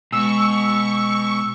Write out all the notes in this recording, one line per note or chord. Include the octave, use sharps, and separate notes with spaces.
B2 G#3 B3 C#6 E6